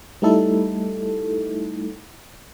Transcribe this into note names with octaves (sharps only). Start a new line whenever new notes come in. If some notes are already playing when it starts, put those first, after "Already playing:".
G3 A3 D#4 E4 A4